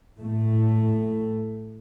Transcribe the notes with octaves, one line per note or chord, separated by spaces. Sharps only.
A2 A3